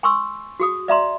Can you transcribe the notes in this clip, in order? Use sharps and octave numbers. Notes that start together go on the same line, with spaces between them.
G#5 C6 C#6 E6
F#4 G#4 D#6
D5 E5 A#5 C6